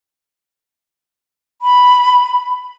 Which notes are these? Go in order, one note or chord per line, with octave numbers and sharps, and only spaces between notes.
B5